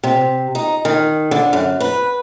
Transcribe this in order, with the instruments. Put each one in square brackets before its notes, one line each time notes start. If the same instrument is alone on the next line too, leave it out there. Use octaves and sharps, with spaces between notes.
[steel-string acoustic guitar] C3
D#4
D#3
D3
F#2
B4